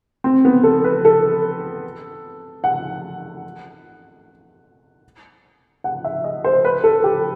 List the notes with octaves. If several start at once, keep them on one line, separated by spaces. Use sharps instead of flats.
C4
B3
A4
B4
A4
F#5
F#5
E5
D#5
C5
B4
A4
G4